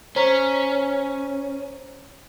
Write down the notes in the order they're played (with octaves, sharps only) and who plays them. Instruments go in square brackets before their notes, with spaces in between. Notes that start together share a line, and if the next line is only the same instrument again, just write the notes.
[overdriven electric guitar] C#4 [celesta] C5 A#5 B6